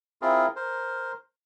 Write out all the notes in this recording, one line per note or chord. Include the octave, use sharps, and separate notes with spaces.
C4 E4 F4 G#4 A#4
A#4 C5